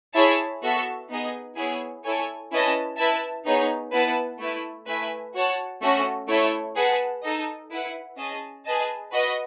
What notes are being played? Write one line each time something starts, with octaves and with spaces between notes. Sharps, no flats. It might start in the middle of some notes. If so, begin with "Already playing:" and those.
E4 G#4 C#5 E5 A5
B3 F#4 A4 E5
B3 D#4 G#4 D#5
B3 E4 G#4 C#5
E4 A4 C#5 G#5
C#4 E4 B4 D#5 A5
E4 B4 E5 A5
B3 D#4 G#4 C#5
B3 E4 B4 F#5 A5
A3 E4 B4
A3 E4 B4 E5 G#5
F#4 C#5 F#5 A5
A3 C#4 F#4 A4
A3 E4 A4 C#5
G#4 B4 F#5 A5
D#4 A4 D#5
E4 B4 F#5
C#4 G#4 D#5 A5
G#4 B4 D#5 A5
F#4 B4 D#5